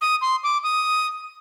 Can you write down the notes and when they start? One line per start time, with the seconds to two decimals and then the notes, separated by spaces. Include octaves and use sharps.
0.01 D#6
0.22 C6
0.43 D6
0.63 D#6